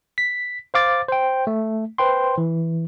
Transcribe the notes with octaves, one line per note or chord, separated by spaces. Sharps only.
B6
C5 F5 D6 A6
C5 G5
A3
B4 C5 G5 C6
E3